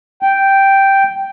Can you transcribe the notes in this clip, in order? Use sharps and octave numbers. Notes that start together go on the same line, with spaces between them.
G5